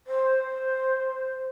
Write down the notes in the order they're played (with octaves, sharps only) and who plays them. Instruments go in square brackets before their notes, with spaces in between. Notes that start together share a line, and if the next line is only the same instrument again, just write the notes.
[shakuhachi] C5